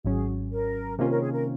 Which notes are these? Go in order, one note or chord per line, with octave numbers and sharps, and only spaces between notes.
G#1 G#2 F#3 C#4 G#4
A#4
C3 D#3 A#3 C#4 F4 A#4
A#4
G#4
A#4